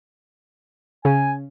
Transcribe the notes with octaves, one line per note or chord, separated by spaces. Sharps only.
C#3 G#5